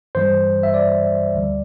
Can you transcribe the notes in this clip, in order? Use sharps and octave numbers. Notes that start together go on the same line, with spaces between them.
G2 E3 G3 C5
E5
D5
D2 D3 G3